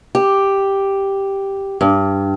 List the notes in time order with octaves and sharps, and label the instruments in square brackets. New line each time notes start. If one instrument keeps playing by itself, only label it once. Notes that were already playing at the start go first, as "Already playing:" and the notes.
[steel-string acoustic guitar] G4
G2